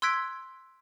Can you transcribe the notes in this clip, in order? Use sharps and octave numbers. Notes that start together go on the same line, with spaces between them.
C6 E6 F#6 G#6 B6 D7